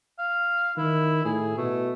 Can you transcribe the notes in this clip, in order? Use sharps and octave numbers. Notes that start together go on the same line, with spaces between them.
F5
D#3 E4
A2 G#4
B2 A3